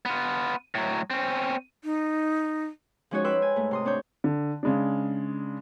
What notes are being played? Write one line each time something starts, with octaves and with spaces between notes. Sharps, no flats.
B3 F4
A2 F#3
C4 C#4
D#4
F3 G#3 C#4 D#4 F#4 C#5
B4 G5 B5 C6 E6
G#5
G#2 A3
C3 C6 D#6
C4 D4 C#5 G6
D3
C#3 G#3 D4